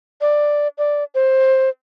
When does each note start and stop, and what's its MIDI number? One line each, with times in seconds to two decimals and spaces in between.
0.21 0.68 74
0.78 1.04 74
1.15 1.69 72